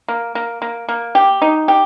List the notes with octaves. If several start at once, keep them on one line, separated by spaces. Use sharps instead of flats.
A#3
A#3
A#3
A#3
G4
D#4
G4